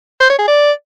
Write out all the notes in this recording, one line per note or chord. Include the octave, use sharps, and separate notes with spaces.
C5
C#5
G#4
D5